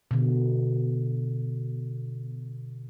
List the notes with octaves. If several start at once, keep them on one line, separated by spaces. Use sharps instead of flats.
B2 D3